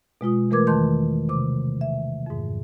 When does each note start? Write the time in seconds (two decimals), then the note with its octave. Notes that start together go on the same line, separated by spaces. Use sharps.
0.21 B2 G#3 F4 D#6
0.51 E3 A3 A#4 B4 D6 G#6
0.67 E2 D#3 A5 C6 G6
1.29 C3 D6
1.81 E5
2.26 F2 G#2